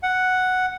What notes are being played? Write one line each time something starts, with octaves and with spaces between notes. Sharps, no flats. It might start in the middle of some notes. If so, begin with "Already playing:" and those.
F#5